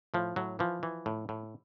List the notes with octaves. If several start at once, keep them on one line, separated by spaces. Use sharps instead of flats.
A2 F3
A2 F#3
E3 F3
E3
A2
A2